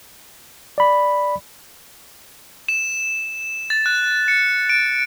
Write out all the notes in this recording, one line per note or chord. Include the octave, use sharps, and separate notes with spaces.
D5 B5
E7
A6
F#6
C#7
D7